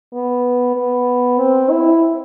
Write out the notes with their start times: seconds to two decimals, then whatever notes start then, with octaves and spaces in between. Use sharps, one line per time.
0.13 B3
0.76 B3
1.39 C4
1.71 E4